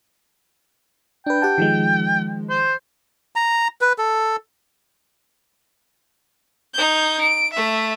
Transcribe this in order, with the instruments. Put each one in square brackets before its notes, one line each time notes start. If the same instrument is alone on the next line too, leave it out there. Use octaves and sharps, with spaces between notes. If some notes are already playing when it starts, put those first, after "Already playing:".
[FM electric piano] D4 B4 [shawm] G5
[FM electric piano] G4 F#5 A5
D#3 F3 G#3
[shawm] C5
[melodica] A#5
B4
A4
[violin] D#4 G6
D7
A3 E5